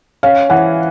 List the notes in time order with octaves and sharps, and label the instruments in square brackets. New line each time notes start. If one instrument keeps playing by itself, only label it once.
[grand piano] C#4 [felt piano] F5
[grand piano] E3 [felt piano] F#5